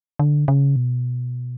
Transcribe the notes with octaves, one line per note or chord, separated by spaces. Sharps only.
D3
C#3
B2